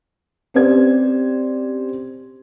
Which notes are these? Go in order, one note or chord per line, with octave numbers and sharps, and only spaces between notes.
C4 C#4 G4 C5 D5 G#6